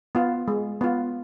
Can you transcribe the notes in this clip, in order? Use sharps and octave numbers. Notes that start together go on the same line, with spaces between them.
B3 F4
G#3
B3 F4